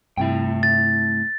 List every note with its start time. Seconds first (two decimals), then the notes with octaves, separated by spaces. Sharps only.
0.17 G2 C3 A3 E4 G5
0.63 A6